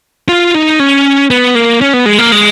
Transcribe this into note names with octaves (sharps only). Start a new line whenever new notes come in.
F4
D#4
C#4
B3
A#3
C#4
B3
G#3
A#3
G#3